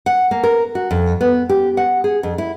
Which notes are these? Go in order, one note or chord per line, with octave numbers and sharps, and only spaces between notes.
F#5
A#3
A#4
F#4
F2
B3
G4
F#5
G#4
F2
E4